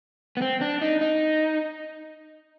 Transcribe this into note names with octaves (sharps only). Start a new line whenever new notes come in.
B3
C4
D4
D#4
D#4